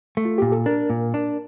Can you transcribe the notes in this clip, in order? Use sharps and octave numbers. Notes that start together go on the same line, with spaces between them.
A3
F4
A#2 G4
A4
D4 A#4
A#2
D4